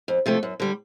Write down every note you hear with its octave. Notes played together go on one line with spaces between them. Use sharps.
F2
C3 F3 A3
F#2
D3 G3